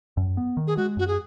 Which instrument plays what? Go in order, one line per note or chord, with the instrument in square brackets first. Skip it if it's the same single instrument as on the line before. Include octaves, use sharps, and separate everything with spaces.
[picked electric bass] F#2
B3
D#3
[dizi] G#4
[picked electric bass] G#3 [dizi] F#4
[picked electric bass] F#2 [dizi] F#4
[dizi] G#4